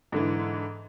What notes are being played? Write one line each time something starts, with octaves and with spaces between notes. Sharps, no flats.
G#2 D3 E3